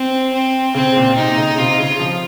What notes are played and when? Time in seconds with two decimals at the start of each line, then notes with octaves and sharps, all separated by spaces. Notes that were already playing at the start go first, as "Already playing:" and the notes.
Already playing: C4
0.33 C4
0.75 C#3 C4
0.96 A#2
1.16 C3 D#4
1.37 C#3
1.57 C3 F4
1.78 C#3
1.99 F3